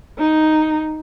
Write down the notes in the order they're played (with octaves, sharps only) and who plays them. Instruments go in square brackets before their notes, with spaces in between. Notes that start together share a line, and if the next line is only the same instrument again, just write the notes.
[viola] D#4